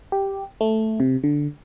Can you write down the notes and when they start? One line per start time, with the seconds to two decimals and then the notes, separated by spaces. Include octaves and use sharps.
0.12 G4
0.61 A3
1.00 C3
1.24 D3